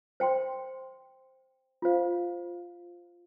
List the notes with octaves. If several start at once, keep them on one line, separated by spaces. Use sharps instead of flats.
C5 G5 C6
F4 C5 F5